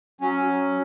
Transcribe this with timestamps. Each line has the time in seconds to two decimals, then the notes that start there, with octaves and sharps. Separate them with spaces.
0.21 F#3 C#4
0.46 F#3